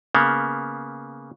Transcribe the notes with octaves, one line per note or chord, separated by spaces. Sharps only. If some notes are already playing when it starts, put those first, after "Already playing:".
C#3 A#3 B3